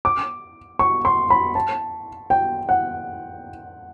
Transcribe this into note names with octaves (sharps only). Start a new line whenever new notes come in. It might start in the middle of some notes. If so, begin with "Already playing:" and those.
D6
C#6
C6
B5
A5
G5
F#5